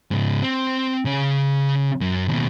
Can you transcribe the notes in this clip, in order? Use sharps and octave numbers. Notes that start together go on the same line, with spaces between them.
G#2 C#3
C4
C#3 C#4
F#2
D#2 B2